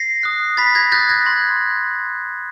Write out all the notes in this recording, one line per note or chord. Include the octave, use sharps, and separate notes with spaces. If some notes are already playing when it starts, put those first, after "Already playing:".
Already playing: A#6 C7
D#6 F#6
B5 A6 B6
G#6 A#6
D#6 F#6 G6 A6
G#6 A#6
C6